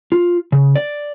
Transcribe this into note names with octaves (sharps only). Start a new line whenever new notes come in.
F4
C#3
D5